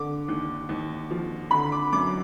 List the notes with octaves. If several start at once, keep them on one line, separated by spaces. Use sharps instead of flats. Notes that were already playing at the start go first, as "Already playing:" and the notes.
Already playing: D3 D6
D#2
D#2
F3
D3 B5
D6
F#2 D6